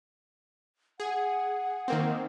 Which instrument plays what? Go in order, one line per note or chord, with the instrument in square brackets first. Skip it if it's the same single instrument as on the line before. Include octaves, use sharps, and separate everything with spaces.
[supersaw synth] G#4 [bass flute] F#5
[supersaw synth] D#3 A#3 C4